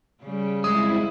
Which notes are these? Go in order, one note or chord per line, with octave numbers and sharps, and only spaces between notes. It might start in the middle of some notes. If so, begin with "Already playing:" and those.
C#3 G3
F2 G#3 E4 D#6